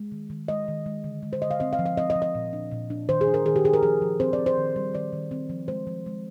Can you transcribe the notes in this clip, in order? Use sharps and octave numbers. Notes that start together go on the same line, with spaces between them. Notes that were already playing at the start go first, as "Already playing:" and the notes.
Already playing: G#3
D#3
D#3
G#3 D#5
D#3
G#3
D3
G#3
C5
D3 D#5
F5
C4 D#5
F5
F3
F5
C4 D#5
D#5
F3
D#5
A#2
D4
A#2
D4
D#3 C5
G#4
D4
A#4
D#3 G#4
G4
D4 G#4
A#4
F3 G#4
F3
C4 C5
D5
C4
C5
D#3
G3
D#3 D5
D#3
C4
F3
G#3 C5
F3
G#3